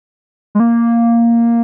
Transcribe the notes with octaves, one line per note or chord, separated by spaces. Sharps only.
G#3
A#3